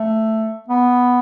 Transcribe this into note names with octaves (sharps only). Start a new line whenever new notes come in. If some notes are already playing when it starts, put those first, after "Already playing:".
Already playing: A3
B3